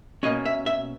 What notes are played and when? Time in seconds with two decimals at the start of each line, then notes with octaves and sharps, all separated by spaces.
0.23 B2 A#3 C#4 D#5
0.45 E5
0.66 E5